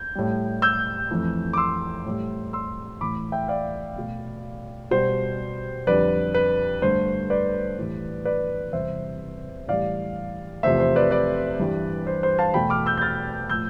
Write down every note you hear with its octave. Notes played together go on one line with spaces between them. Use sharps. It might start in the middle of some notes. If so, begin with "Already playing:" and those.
Already playing: G6
A2 G3
E6 G6
F2 E3 A3
D6
C6 E6
A2 G3
C6 E6
A2 E3 A3 B5 D6
E5 G5
D5 F5
B2 A3
B2 G3 C5
F2 D3 G3 B4 D5
B4
G2 D3 A3 C5
B4 D5
A2 E3 G3
B4 D5
E2 C3 G3 C5 E5
A2 E3 G3 D5 F5
E2 C3 F3 A3 C5 E5
C5
B4 D5
B4 D5
G2 E3 G3
C5
C5
F5 A5
E2 B2 A3 G5 B5
D6 F6
E6 G6
G6
F6 A6
A2 F3 A3 E6 G6